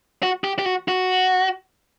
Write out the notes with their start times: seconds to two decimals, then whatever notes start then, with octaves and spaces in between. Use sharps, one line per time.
0.23 F#4
0.44 G4
0.59 G4
0.66 F#4
0.88 F#4